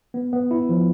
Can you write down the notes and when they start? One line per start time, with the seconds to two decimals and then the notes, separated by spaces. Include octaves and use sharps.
0.14 B3
0.33 B3
0.51 E4
0.69 F3